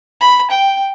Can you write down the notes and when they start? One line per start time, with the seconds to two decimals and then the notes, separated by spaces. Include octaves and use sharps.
0.21 B5
0.51 G5